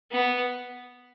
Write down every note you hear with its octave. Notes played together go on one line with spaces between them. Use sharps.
B3